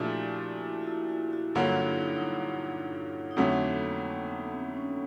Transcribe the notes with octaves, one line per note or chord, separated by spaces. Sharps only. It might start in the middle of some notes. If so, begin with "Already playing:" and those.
Already playing: A#2 F3 A3 D4 E4 F#4 G4
E4 F#4
F4
E4 F#4
E4 F#4
E4 F#4
G2 D3 F#3 A#3 F4
E4
D#4
D#4
D4
D#4
F2 D3 F#3 A3 D4
B3
A#3
B3
C4
C#4